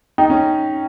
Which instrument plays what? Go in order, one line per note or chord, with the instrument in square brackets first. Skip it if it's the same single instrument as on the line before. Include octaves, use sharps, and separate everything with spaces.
[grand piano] D#4 [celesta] G5
[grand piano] C#4